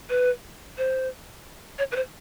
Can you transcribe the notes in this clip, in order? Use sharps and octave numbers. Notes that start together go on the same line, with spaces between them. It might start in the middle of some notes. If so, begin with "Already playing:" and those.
B4
C5
C#5
B4
C5